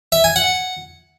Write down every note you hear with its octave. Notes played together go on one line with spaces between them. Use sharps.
E5
G#5
F#5